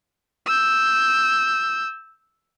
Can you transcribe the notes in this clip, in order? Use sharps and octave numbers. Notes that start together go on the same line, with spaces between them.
E6 G6